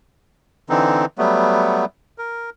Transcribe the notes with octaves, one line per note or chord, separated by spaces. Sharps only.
D3 E3 C4 D#4
F#3 G3 A3 B3
A#4